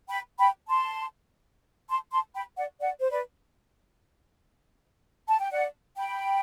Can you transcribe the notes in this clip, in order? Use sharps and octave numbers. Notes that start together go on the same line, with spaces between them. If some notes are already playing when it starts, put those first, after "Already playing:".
G5 B5
G5 B5
A5 C6
A5 C6
A5 C6
G5 B5
D5 F#5
D5 F#5
C5
B4 D5
A5
G5
D5 F#5
G5 B5